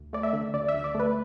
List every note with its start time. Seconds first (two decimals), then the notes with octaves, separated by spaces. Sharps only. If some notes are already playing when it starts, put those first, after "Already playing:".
Already playing: D2
0.13 A3 D5
0.23 E5
0.33 D3
0.54 D2 D5
0.68 E5
0.74 D2
0.84 D5
0.95 A3 B4